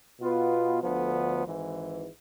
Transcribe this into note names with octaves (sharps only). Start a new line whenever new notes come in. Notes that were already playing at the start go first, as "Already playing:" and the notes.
B2 B3 F4 B4
D2 D3 F3 B3
G#1 G#2 E3